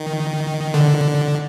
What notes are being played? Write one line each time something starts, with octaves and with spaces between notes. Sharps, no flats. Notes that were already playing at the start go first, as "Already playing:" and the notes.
Already playing: D#3
D3